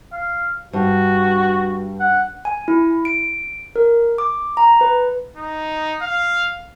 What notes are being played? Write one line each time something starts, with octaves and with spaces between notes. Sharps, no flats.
F5
G2 F#4
F#5
G#5
E4
D7
A#4
D6
A#5
B4
D#4
F5